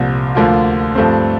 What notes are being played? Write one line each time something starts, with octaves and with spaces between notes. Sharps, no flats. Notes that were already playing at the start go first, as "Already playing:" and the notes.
Already playing: C2 A#2 F3
D2 D3 F3 A#3 F4
G2 F3 A3 C4